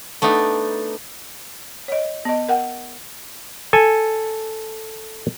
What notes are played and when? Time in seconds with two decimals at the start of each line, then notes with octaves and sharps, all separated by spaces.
0.22 A3 B3 D4 D#4
1.88 C#5 D#5
2.25 B3 D#5
2.49 A#4 F#5 G5
3.73 A4 G#5